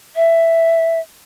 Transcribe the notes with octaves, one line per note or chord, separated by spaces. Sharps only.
E5